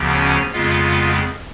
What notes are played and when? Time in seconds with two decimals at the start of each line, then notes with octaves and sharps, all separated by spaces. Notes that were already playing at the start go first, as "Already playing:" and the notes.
Already playing: D2 C#3 F3 B3
0.13 C#4 C#5
0.53 F2 C#3 G#3 B3 F4 F5